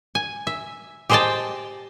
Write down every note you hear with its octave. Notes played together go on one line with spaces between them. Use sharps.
G#5
E5
G4 G#4 C5 D#5 G5 A5